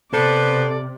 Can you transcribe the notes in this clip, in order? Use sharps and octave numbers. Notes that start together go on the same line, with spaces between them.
C3 B3 A4 B4 C5 D5